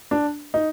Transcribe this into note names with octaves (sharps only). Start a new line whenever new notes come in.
D4
D#4